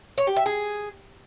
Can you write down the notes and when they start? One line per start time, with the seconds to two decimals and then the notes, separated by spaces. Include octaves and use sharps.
0.18 C#5
0.27 G4
0.36 E5
0.46 G#4